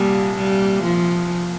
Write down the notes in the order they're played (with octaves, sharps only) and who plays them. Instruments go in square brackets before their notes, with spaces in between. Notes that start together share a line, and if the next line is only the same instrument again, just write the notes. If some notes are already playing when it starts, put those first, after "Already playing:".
Already playing: [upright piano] C2 A#2 [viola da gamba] G3
[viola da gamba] G3
F3